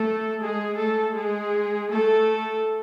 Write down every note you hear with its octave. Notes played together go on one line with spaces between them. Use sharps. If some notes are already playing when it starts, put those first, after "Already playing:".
Already playing: A3 A4
G#3 G#4
A3 A4
G#3 G#4
A3 A4